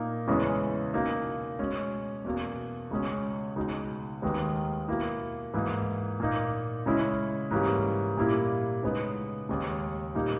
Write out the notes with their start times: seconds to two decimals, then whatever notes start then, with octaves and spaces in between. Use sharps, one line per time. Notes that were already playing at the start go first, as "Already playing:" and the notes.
Already playing: A#2 A#3 D#4
0.27 E2 C#3 E3 G#3 C#4
0.94 B2 A#3 D#4
1.59 B2 G#3 C#4
2.24 E2 B2 A#3
2.91 C#2 B2 G#3 C#4
3.56 C#2 B2 G#3 D#4
4.22 D#2 D#3 G#3 B3
4.88 B2 A#3 E4
5.54 G#2 E3 A#3 E4
6.20 A#2 A#3 D#4
6.86 C#3 G#3 C#4 E4
7.51 G#2 E3 G3 A#3 C#4
8.17 A#2 G3 A#3 E4
8.83 C#3 G#3 B3 D#4
9.49 D#2 C#3 G#3
10.15 A#2 G3 A#3 D#4